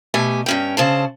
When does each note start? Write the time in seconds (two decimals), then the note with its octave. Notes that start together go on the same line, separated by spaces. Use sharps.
0.14 B2 A3 G4 G#5
0.46 G2 C#4 G5
0.77 D2 C#3 C5 A5